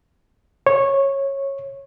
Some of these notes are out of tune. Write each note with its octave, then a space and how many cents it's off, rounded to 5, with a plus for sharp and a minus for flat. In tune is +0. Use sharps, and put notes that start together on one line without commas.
C#5 -15